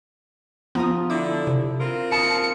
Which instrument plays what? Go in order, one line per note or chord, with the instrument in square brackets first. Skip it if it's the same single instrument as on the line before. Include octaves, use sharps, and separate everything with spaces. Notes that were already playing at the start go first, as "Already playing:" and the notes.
[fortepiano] F3 A#5 D#6 [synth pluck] B3
[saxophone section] D3 E4 [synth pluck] D6
[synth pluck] C3
[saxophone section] C4 F4 A#4
[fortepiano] A5 D#6 [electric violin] C#7